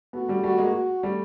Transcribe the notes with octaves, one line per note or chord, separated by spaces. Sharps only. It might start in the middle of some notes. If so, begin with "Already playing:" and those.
A3 B3 F#4
G3 A3
G3 A3 F#4
G#3 A#3
F#4
G3 A3